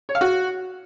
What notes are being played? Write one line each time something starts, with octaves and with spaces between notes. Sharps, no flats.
C#5
F5
F#4